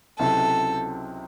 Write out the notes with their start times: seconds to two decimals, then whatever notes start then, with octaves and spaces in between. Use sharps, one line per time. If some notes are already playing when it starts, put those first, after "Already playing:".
0.19 C#2 C3 F#3 C4 E4 A4